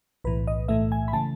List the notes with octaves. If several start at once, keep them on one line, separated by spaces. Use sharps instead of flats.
B1 A2 E3 B4
D#5
B1 A2 E3 A3 E5
G#5
B5
C#3 E3 A3 A5